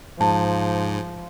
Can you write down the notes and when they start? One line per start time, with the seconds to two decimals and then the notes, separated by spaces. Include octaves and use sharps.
0.21 G#2 F3 A5